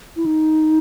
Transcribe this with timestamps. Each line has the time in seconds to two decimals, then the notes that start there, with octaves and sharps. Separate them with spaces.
0.16 E4
0.26 D#4